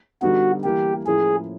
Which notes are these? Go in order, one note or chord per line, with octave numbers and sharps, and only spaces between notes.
D3 G3 B3 D#4 F#4
E3 G3 A#3 G4
A2 F3 A#3 C#4 E4 G#4